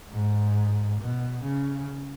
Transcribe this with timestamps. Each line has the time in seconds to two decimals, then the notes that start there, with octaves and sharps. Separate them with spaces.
0.11 G#2
1.00 B2
1.43 C#3